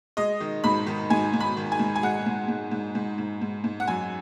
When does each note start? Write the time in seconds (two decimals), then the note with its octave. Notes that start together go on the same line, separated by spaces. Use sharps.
0.17 G#3 D#5
0.40 D#3
0.64 G#2 B5
0.86 D#3
1.10 G#2 G#5
1.34 G#2
1.40 B5
1.57 D#3
1.72 G#5
1.79 G#2
1.96 G#5
2.02 G#3 F#5
2.26 G#2
2.48 G#2
2.71 G#2
2.95 G#2
3.18 G#2
3.41 G#2
3.64 G#2
3.80 F#5
3.88 F#2 G#5